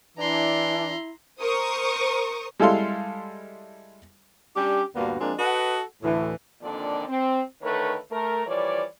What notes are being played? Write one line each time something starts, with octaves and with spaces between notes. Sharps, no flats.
E3 D4 E4 A#5 C6
A#4 C5 C#6 D#6
G3 G#3 E4 A4 F5 C6
G3 C#4 D4 G4
D2 G2 A#2 A#3 B3 F#4
F3 G#3 A#3 C4 D4
F#4 A4 B4 D#5 F#5
D2 A2 E3
F2 A#2 D3 D#3 D4 D5
C4
D3 D#3 A3 A#4 B4 C#5
A3 A#4
E3 F3 G3 C#5 D5